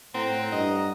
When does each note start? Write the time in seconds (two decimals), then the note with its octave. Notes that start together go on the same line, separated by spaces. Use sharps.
0.14 A2 C4 F#5 A#5
0.52 G2 D#5